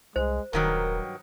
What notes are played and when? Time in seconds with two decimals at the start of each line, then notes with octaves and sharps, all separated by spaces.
0.16 C2 G#3 C5
0.53 D#1 G2 D#3 F#3 A#4